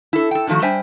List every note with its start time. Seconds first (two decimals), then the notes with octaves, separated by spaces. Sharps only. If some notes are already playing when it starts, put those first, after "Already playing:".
0.13 E4 A4
0.31 A4 G5
0.47 D3 D#3 F3 A3 F#4
0.62 G3 D4 C5 E5 G5 G#5